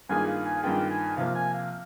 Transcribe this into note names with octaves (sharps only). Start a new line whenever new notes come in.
G2 D#3 A#3 F4 G#4 G#5
F5
G#5
G2 D#3 A#3 F4 G#4 G5
G#5
C3 F3 A#3 F5
G#5
F5